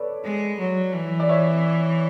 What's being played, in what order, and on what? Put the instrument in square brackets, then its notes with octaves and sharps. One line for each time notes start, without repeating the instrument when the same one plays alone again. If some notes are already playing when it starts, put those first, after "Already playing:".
Already playing: [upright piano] A4 B4 C#5 D5
[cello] G#3
F#3
E3
[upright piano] D5
C#5 E5